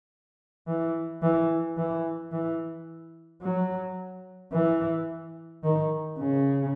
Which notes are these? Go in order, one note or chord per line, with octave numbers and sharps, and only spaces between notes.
E3
E3
E3
E3
F#3
E3
D#3
C#3